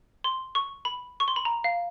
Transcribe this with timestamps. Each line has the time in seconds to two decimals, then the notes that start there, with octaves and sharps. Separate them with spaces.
0.24 C6
0.55 C#6
0.85 B5
1.20 C#6
1.28 C6
1.36 B5
1.45 A#5
1.64 F5